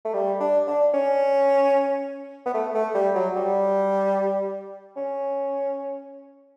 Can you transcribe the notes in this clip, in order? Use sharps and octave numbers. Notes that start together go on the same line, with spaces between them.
A3
G3
D4
D4
C#4
B3
A3
A3
G3
F#3
G3
C#4